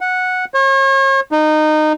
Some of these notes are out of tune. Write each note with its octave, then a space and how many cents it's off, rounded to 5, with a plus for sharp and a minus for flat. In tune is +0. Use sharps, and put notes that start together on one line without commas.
F#5 -10
C#5 -40
D#4 -20